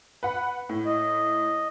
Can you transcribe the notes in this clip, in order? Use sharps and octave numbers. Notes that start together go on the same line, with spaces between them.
B4 F#5 B5
A2
D#5